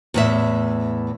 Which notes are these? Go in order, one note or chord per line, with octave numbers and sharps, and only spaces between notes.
E2 A2 E5